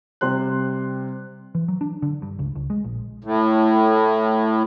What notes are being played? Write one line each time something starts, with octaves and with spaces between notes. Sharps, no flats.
C3 G3 C5 C6 F#6
E3
F#3
D4
D3
G2
C#2
C#2
G#3
A#1
A2